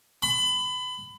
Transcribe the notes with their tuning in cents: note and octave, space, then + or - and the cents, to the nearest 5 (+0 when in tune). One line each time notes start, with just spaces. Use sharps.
B5 +30